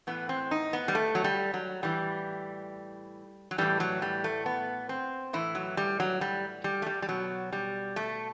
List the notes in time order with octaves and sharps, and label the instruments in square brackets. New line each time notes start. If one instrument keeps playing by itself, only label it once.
[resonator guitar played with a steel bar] A2 E3 B3
C4
D#4
B3
G3
A3
F#3
G3
F#3
A2 E3 G3
F#3
A2 E3 G3
F#3
G3
A3
B3
C4
A2 E3 E4
F#3
G3
F#3
G3
G3
A3
G3
G3
B2 F#3
G3
A3